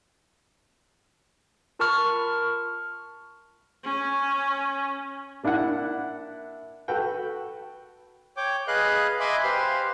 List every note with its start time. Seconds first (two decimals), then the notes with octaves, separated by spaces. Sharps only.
1.79 F4 A#4 A5 B5 C#6 F6
3.84 C#4
5.43 A#3 D4 E4 E5 F#5
6.88 F#4 A4 B4 F#5 G5
8.37 C#5 G5 D6
8.68 G#4 B4 D#5 F5 F#6
9.20 D#5 E5 G#5 B5 C6 D6
9.44 G4 B4 C5 F5 C6